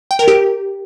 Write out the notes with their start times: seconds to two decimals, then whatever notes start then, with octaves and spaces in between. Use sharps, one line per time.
0.11 G5
0.19 A#4
0.28 G4